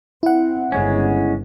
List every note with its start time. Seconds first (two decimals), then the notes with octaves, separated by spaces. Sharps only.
0.23 C4 E4 F#5
0.72 G1 C#3 G#3 C#4